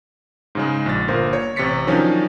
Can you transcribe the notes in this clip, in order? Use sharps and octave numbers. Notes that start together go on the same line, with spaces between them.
G#2 C#3 G#3
A#1 A6
G1 A#2 A#4 C5
C#5
A1 C3 C#6 A6 B6 C#7
D#3 F3 F#3 C#4 D4